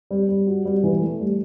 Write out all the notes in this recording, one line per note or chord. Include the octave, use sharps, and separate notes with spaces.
G3
G3
F#4
G3
E3
A3
G3